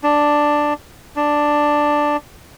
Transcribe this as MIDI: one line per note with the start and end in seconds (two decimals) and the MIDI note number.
0.03 0.73 62
1.16 2.17 62